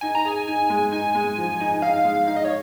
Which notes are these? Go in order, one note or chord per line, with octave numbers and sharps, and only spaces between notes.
D#4 G#5
A#5
G#4 G#5
D#4
G#3
D#4 G#5
G#3
F3
D#4
D#4 F5
G#3
D#4 F5
D#5
C#5